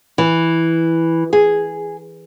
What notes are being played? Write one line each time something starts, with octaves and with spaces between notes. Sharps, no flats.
E3
G#4